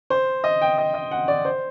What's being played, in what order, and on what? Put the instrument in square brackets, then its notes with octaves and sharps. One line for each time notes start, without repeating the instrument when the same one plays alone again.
[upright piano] C5
D#5
G5
D#5
D#5
F#5
D5
C5